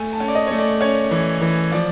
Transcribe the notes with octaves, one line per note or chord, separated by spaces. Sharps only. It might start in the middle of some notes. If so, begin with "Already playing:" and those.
Already playing: A3 G#5
A5
C#4
D5
D#5
A3 C#5
D5
C#4 C#5
E3
E3
F3 D5